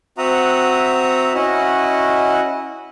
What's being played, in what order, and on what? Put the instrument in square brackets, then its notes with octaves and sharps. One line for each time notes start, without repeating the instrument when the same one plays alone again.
[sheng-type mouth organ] C4 F#4 E5 F#5 A#5 D#6
C#4 E4 F#4 D#5 F#5